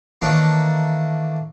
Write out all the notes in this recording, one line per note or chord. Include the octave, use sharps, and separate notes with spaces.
D#3 E3 A3 A#3 D4 C#5